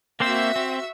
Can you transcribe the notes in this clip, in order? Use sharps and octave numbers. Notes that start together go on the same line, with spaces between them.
A#3 C4 F#4 C5 E5 E6
C4